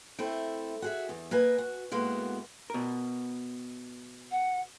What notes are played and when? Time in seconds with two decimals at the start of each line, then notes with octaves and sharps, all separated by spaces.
0.19 A3 C4 E4
0.82 F#4 G#4 E5
1.09 E2
1.31 A#3 B4 D#5 G#5
1.58 F#4
1.91 A2 G#3 A#3 B3 F#4
2.70 B2 A#4
4.31 F#5